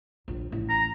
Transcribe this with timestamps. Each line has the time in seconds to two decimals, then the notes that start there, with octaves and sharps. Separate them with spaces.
0.28 A#1 D#2
0.52 A1
0.69 A#5